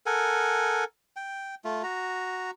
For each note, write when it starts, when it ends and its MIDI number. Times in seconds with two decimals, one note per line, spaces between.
0.06 0.84 69
0.06 0.84 70
0.06 0.84 78
0.06 0.84 80
1.16 1.55 79
1.64 1.82 57
1.64 1.82 65
1.83 2.51 66
1.83 2.51 82